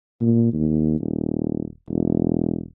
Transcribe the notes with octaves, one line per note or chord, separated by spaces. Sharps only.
A#2
D#2
D#1
E1